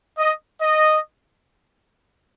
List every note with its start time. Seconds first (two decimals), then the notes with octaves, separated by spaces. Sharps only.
0.18 D#5
0.60 D#5